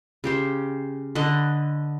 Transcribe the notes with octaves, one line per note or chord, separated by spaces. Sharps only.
C#3 G4 C5
D3 B4 D#5